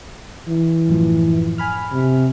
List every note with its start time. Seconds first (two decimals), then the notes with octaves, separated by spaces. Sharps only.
0.48 E3
0.88 F#2 A2 F3
1.58 G#5 B5 F6
1.92 C3